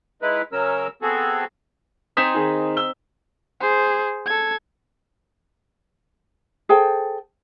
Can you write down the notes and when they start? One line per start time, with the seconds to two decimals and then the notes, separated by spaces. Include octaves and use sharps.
0.22 G#3 D#4 E4 B4
0.52 C#3 F#3 C#4 A#4 E6
1.02 B3 C4 F#4 G#4 A4
2.17 C4 D#4 G#5 D#6 B6 E7
2.34 D#3 G#4
2.77 E6 G7
3.61 G#4 C5
4.26 A4 G#6
6.69 G#4 A4 C5 G5